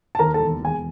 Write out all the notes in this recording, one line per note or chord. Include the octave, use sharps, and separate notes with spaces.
A5
D#2 A#4 A#5
E1 A4 A5
E1
G#4 G#5